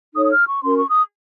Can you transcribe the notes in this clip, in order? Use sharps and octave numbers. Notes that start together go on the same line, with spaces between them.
D#4 A4 C#5 D#6
D#6
F6
C#6
C#4 F#4 A#4 C6
C#6
D#6